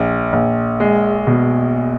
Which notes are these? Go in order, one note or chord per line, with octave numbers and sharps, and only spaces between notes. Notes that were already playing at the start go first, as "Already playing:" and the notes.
Already playing: A#1
A#1
G#3
B2